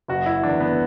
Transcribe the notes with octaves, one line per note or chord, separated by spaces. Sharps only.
F#1 F#4
E4
E2 D3 D4
B3